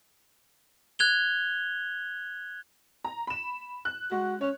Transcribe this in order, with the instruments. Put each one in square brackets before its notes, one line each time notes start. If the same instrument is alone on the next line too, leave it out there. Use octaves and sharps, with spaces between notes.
[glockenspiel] F#6 G#6 F7 G7
[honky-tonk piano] A#5
B5 E7
F#6
[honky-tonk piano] G#3 [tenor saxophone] F#4
[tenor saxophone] C#4 [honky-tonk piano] C#5